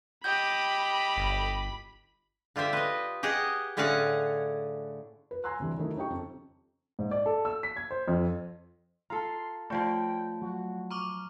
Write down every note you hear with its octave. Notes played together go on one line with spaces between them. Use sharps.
G4 D#5 B5 G6
G1
D3 F4 G4 C5 E5
B4 D#5
G4 G#4 D#5 F#5
A2 D3 C#4 G#4 F5 F#5
B4
G#5 A#5 C6 E6 F#6
D2 C3 E3 G3
D#3 F#3 A3 D#4 E4
D#4 G4 D#5 G5 C#6
F2 C#3
G#2
D5
A4
E6
B6
G#6
C5
F2
C5
F4 A4 A#5 C6
F3 A3 F4 C#5 G5
F#3 F#4
A#5 C#6 D6 F6